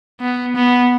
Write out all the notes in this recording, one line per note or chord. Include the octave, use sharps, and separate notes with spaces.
B3
B3